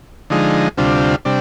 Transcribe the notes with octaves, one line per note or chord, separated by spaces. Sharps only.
D3 F3 G#3 D#4
D2 C3 G3 D4 F4
C3 G3 D4